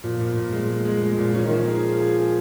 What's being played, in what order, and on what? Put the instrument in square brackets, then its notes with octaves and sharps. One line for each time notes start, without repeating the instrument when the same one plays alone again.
[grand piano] A#2 [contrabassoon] F3
[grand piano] A#2
A#2
G#3
G#3
G#3
G#3
A#2
[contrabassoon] F3 [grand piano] C#4
[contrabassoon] D#3
[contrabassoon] F3 [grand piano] A#3
[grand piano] G#4
G#4
G#4
G#4